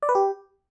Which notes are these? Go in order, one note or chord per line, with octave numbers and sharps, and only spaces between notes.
D5
B4
G4